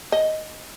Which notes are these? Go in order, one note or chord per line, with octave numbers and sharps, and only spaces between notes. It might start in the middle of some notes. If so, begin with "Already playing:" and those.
D#5